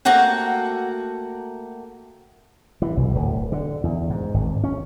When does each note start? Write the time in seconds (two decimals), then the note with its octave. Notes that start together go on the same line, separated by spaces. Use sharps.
0.05 A3 A#3 F#4 F#5 G5
2.82 E3
2.97 B1
3.15 D1
3.52 D3
3.84 E2
4.10 G#2
4.34 G#1
4.64 C#4